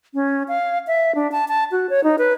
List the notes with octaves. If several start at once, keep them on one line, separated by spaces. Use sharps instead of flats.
C#4
F5
E5
D4
A5
A5
F#4
C#5
D#4
B4